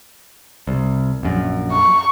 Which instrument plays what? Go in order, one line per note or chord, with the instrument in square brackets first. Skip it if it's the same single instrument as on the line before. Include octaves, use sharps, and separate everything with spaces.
[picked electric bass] C2
A#1 F#2
[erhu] C#6